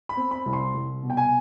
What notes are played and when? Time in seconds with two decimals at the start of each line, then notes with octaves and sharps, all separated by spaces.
0.09 B5
0.17 C4
0.31 B5
0.46 C2
0.53 C6
0.74 C2
1.03 B2
1.10 G5
1.17 G#5